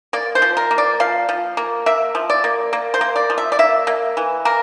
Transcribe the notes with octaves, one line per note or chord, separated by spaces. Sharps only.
A#3 D5
C5
F3
A#4
A#3
D5
F3 F5
F3
A#3
A#3 E5
F3
D5
A#3
A#3
C5
A#3
D5
F3
E5
D5
A#3 E5
A#3
E3
A#3 A#4